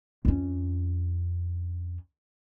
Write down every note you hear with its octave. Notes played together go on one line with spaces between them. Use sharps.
F2 C#4